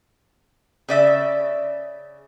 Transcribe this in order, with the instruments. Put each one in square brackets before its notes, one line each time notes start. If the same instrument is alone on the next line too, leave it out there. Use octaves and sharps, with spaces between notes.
[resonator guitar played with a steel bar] C#3 D5 E5